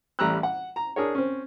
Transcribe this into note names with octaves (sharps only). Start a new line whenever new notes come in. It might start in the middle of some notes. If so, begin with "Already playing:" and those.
A1 G3 A#5 B5 E6 F#6
F#5
A#5
D4 G#4 A#4 C#5
C4 C#4